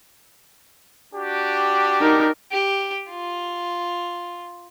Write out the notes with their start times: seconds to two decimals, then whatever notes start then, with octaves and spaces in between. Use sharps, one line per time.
1.14 D4 F#4 G4
2.01 D#4 A#4
2.52 G4
3.10 F4